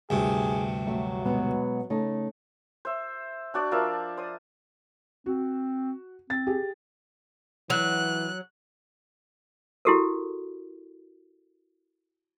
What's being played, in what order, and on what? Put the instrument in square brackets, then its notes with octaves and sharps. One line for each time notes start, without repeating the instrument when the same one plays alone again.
[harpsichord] D2 G2 C3 [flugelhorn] G#4
[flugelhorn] F#3 [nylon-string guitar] A3 E5
[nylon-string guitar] B2 G#3 B3
C#3 A3 D#4
[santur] C5 E5
D4 F#4 D5
F3 A#4 D5 E5
C5 D#6
[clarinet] C4 [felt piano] F#4
[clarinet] C4 [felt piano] A6
[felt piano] G4 G#4
[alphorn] E3 [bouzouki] F#3 [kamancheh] F#6
[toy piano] E4 F#4 G4 A4 A#4